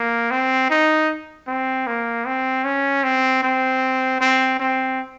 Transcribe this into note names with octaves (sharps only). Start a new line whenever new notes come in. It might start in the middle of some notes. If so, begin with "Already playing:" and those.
Already playing: A#3
C4
D#4
C4
A#3
C4
C#4
C4
C4
C4
C4